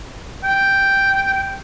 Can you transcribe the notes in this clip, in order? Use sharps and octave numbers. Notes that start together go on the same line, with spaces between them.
G5